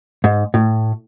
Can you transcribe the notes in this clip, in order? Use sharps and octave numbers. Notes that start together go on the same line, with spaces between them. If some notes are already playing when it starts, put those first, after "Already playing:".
G#2
A2